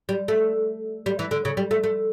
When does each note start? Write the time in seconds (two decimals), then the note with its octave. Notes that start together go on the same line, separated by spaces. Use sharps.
0.09 G3
0.28 A3
1.06 G3
1.19 E3
1.31 D3
1.45 C#3
1.57 G3
1.71 A3
1.83 A3